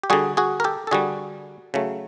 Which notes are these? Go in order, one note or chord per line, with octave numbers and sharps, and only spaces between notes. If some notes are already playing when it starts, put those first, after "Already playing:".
G4
D3 G3 F#4 G#4
F#4 G#4
A#4
G4 A4
A4
D3 G3 F#4 G#4
C#3 F#3 A3